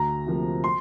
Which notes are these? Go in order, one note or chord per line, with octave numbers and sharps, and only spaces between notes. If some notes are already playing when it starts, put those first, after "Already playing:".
Already playing: D2 A#5
C3 F3 A#3
C6